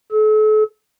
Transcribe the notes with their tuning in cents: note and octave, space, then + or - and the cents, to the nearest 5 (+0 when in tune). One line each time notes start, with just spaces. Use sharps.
A4 -40